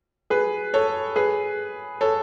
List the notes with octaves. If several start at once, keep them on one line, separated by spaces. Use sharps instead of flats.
G#4 B4
A4 C#5
G#4 B4
A4 C#5